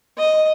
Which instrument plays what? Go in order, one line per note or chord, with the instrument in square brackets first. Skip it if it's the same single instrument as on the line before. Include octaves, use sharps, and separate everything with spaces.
[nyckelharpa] D#5